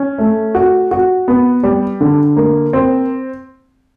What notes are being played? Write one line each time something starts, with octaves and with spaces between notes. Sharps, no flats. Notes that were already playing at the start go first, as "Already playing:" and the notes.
Already playing: C#4
A3
F#4
F#4
B3
G3
D3
A#3
C4